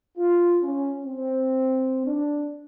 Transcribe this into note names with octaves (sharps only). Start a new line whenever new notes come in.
F4
C#4
C4
D4